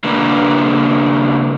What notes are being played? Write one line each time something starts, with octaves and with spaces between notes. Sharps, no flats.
C#3 A#3 D4 F4 B4